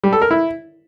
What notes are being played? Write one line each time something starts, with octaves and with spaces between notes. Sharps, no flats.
G3
A4
A#4
E4